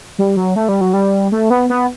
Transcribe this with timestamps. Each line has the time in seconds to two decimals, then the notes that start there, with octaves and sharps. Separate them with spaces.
0.19 G3
0.37 F#3
0.56 A3
0.69 G3
0.81 F#3
0.93 G3
1.32 A3
1.50 B3
1.70 B3